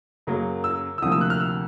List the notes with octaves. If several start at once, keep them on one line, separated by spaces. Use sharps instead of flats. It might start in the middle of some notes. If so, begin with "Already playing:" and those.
F#2 C#3 F#3 A#3
E6
E6
D2 C3 F3 A#3 D#6
E6
F#6
F6
E6